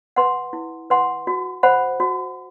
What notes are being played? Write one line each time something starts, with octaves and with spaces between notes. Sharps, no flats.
B4 F#5 C6
E4
B4 F#5 C6
F#4
C5 F#5 B5
F#4